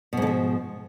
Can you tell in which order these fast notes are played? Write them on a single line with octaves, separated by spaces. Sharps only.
B2 G#2 D3 F3